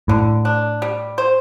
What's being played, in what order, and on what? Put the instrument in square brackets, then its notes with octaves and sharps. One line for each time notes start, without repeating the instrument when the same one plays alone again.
[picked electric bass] A2 [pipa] D3
[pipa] D4
G3
C5